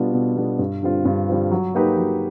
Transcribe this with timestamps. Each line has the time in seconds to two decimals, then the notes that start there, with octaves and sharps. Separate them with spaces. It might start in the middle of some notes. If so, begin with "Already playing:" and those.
Already playing: B2 G3 B3 D4 F4
0.14 B2
0.37 G3 B3 D4 F4
0.59 G2
0.83 D3 G3 C4 F4
1.05 G2
1.29 D3 G3 C4 F4
1.51 F#3
1.74 A#3 D#4 G4 B4
1.98 F#3